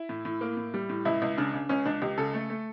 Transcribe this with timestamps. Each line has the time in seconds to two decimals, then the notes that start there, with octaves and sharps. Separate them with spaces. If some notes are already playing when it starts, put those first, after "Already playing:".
Already playing: E4
0.09 A2
0.25 A2
0.41 A#3
0.57 A2
0.74 G3
0.89 A2
1.05 C#2 E4
1.22 C#2
1.37 C#3 D4
1.54 C#3
1.69 C#2 C#4
1.86 C#2 D4
2.02 C#2 G4
2.18 C#3 A4
2.34 A3
2.50 A3